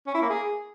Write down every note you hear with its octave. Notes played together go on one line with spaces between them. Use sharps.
C#4
E4
A#3
G#4